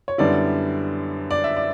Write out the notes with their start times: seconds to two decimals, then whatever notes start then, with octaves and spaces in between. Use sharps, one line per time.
0.08 C#5
0.18 F#2 D3 G3 B3 E4 D5
1.31 D5
1.44 E5
1.57 D5